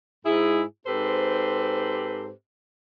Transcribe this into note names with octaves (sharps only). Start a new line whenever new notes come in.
G#2 E4 G#4
G#2 C4 G4 A4 B4 C5